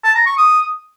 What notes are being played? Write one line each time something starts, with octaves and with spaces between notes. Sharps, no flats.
A5
A#5
C#6
D#6